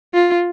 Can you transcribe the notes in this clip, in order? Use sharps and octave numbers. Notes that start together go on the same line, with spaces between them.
F4